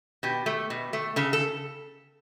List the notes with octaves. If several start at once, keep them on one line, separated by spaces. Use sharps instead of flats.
B2 G4
A3
B2
A3
C#3 A4
A4